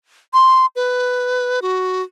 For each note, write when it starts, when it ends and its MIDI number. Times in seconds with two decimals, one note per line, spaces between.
0.33 0.66 84
0.76 1.60 71
1.62 2.03 66